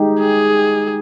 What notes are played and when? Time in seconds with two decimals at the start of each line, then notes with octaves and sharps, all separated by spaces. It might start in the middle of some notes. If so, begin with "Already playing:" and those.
Already playing: G#3 D#4 G4
0.20 G#4